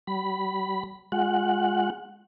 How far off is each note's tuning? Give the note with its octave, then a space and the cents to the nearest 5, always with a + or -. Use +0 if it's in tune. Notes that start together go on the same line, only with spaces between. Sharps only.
G3 -45 B5 +0
G#3 -10 F4 +20 F#5 +0